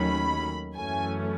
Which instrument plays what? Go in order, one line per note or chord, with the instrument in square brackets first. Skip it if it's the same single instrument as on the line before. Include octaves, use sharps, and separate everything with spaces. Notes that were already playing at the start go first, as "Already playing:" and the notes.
Already playing: [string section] D#2 D#3 F#3 A3 C#4 B5
F#2 E3 A3 C#4 G#5